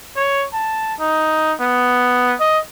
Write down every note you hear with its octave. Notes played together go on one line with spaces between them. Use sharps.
C#5
A5
D#4
B3
D#5